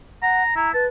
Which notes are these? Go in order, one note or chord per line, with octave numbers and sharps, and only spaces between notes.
F#5 A#5
E4 A#5
B4 A5